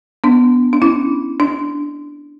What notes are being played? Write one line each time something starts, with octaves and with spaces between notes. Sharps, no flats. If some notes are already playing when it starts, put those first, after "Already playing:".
B3 D4
D4
C#4 E4
D4